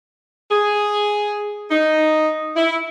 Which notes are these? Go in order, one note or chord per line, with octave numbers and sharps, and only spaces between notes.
G#4
D#4
E4